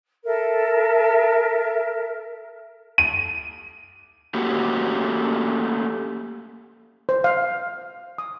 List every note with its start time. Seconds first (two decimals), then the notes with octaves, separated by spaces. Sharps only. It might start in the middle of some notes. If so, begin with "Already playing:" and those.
0.24 A4 A#4 E5
2.98 D#7
4.34 A3 A#3 C#4 F#4 G4
7.09 C5
7.24 F5
8.18 D#6